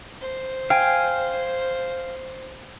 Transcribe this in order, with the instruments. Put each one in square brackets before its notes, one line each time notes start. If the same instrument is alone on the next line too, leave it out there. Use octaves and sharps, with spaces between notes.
[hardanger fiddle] C5
[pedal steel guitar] F5 G#5 [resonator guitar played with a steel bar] G5